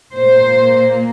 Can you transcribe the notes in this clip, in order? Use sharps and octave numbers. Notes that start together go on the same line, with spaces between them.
A#2 A#3 C5